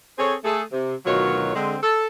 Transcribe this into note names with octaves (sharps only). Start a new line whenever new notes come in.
C4 G#4 A4 C5 C#5
A3 G#4 A4
C3
D2 B2 D#3 F#3 F4 C#5
D3 G#3 C4
A4